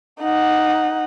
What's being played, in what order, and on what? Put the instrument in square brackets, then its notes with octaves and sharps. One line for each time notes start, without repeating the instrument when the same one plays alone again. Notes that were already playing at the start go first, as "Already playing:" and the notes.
[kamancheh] D#4 F#5